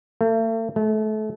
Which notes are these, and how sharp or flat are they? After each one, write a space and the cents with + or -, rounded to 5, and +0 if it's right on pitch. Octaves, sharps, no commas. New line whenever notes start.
A3 +40
A3 -30